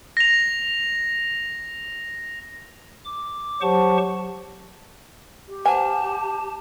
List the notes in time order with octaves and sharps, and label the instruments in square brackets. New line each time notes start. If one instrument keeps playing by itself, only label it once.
[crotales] A#6 F7
[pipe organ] D6
F#3 G4 C5 F#5 A5 C#6
[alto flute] G4
[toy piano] B4 C5 F#5 [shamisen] G#5 [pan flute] A5